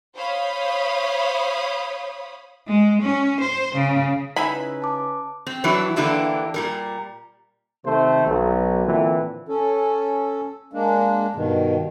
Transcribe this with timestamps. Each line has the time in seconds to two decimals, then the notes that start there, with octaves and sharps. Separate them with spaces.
0.16 C5 C#5 F5 B5 D#6
2.66 G#3
3.01 C#4
3.40 C5
3.75 C#3
4.36 C#3 G#3 C#4 D#4 E4 B4 B5
4.82 A5 D6
5.47 C4
5.64 E3 F#3 G3 D4 E4
5.96 D3 E3 A#3 D4 E4 G4
6.54 A#2 G3 A#4
7.84 C3 D#3 A3 C5
8.26 B1
8.85 A#2 D3 E3 C4
9.48 C#4 A4
10.73 G#3 A#3 D4
11.35 G2 B2 D#3